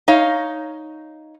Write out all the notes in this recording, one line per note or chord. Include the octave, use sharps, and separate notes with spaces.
D#4 C#5 F5